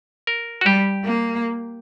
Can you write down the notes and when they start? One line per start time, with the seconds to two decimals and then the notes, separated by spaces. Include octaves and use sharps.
0.27 A#4
0.61 F#4
0.65 G3 G4
1.04 A#3